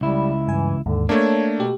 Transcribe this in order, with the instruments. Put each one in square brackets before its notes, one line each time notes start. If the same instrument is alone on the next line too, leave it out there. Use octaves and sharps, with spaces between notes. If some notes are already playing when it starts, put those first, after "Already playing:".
[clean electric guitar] C#2 E4 [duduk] G3
[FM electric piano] G2 G#5 [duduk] E3
[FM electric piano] D#2 G#2 [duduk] D3
[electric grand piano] A3 A#3 [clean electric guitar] D4 [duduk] C#5 [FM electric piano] G#6
[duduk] B2 [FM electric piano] G4